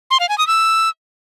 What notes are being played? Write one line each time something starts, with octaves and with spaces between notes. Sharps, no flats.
C6
F5
G#5
D#6
E6